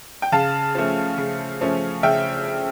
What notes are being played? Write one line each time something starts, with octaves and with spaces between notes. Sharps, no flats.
G5
C#3 F5 A5
F3 A3 C#4
C#3
F3 A3 C#4
C#3 E5 G5